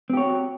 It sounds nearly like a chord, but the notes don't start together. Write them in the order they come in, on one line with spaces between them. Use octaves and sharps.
C4 G4 C#5 F#4